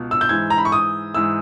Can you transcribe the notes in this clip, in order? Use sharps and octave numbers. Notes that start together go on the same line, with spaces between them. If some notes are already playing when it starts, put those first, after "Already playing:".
Already playing: C#2 B2
E6
G6
G#2 E3 G#6
A#5
B5
C#6
D#6
G#2 E3 E6